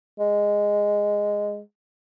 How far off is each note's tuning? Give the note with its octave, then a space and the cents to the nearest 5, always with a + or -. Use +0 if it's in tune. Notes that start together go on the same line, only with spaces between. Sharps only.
G#3 -10